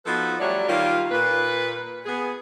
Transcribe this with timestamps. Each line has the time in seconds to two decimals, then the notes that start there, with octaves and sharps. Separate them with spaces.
0.05 F3 B3 D#4 F#4 A4 B4
0.40 F#3 G3 A3 F#4 C#5 D5
0.68 D#3 G3 A#3 F4
1.11 A#2 B4
2.06 B3 G#4